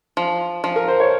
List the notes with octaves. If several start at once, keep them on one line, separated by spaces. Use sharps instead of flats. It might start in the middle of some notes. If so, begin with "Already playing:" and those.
F3
F3
A#4
C5
C#5